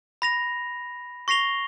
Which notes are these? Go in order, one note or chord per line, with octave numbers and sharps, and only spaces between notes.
B5 A#6 F7
C#6 A#6 C7 F7 G7